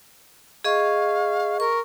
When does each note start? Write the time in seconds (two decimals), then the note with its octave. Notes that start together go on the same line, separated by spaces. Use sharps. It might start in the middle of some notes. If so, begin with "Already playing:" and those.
0.64 G#4 D#5 F5 C#6
1.60 A#4 C#6